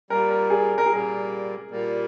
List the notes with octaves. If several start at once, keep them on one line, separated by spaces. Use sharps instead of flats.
A#2 G3 A#3 A#4
A#4
G#4
A#4
G#4
A#2 G3 A#3 A#4
A#2 G3 A#3